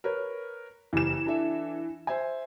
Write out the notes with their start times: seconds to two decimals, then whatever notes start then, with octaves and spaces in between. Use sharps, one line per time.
0.04 A#4 B4 C#5
0.93 F#1 E3 G4 E7
1.26 D4 A4 E5
2.07 C5 E5 G#5